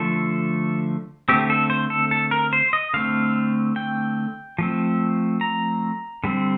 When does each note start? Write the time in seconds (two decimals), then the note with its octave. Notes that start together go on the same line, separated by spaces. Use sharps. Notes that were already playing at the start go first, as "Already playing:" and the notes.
Already playing: D3 F3 A3 A4
1.29 D3 A3 C4 G4
1.50 A4
1.70 C5
1.90 A4
2.11 A4
2.31 A#4
2.53 C5
2.73 D#5
2.94 D3 A3 C4 F5
3.76 G5
4.58 F3 A3 C4
5.41 A#5
6.24 D3 G3 C4